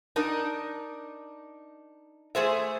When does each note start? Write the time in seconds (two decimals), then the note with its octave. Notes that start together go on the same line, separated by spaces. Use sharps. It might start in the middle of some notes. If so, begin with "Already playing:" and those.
0.16 D4 D#4 A#4
2.35 A3 G#4 C5 E5